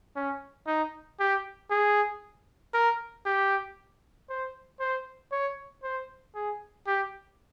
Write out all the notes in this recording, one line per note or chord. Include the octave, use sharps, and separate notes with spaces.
C#4
D#4
G4
G#4
A#4
G4
C5
C5
C#5
C5
G#4
G4